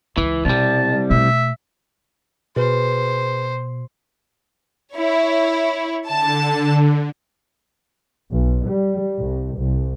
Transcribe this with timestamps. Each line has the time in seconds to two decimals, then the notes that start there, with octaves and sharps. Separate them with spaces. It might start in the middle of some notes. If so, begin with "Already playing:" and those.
0.18 C#2 E3
0.45 C2 B2 G3 A5
1.10 B2 A3 E5
2.56 B2 G#4 B4 C5
4.94 E4 C#5
6.08 D3 A5
8.31 B1
8.67 G3
9.18 C2
9.58 C2